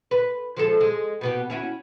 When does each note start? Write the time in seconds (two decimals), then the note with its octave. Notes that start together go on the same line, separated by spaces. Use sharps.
0.11 B4
0.57 F3 G#3 A4
0.81 G#3
1.21 B2 B3 G4
1.50 C#4 E4 F#4